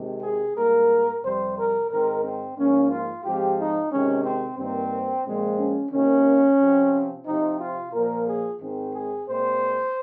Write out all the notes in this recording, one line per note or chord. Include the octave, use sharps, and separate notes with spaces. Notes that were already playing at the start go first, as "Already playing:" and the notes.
Already playing: C3 D#3 G#3 C4
G#4
G#2 G3 A#3 A#4
F2 C3 G3 C5
A#4
G#2 D#3 G#3 C4 A#4
C4
G#2 F3 A#3 C#4
F4
G#2 F3 G#3 C4 G4
D#4
C3 D#3 G#3 C4 C#4
C4
G2 D#3 A#3 C4
A#2 F3 G#3 C4
C#4
C3 D#3 A#3 C#4
C3 F3 C4
C3 F3 C4 D#4
F4
A#2 F3 A#3 A#4
G#4
G#2 D#3 G#3 C4
G#4
A#2 G#3 C4 C5